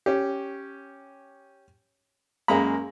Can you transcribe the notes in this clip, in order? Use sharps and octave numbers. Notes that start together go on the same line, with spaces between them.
C#4 G4
F#2 G#3 A#3 A#5 B5